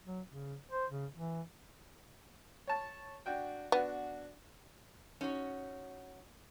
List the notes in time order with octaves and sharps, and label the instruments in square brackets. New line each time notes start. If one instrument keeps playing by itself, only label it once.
[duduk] F#3
C#3
C5
C#3
E3
[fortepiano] C#5 A5
D4 F#4 G5
[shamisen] B3 [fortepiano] D4 F#4
[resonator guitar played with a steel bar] C#4 D#4 F#4 C#5